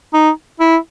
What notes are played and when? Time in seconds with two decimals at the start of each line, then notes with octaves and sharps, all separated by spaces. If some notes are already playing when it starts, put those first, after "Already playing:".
0.14 D#4
0.60 E4